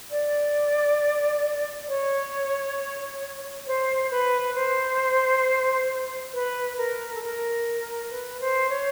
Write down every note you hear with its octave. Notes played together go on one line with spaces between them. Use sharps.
D5
C#5
C5
B4
C5
B4
A#4
A4
A#4
B4
C5
C#5